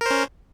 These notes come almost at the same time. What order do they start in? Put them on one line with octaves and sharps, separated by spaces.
A#4 C5 C#4